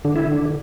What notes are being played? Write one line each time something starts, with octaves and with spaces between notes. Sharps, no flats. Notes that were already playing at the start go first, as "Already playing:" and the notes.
D3
E4
D3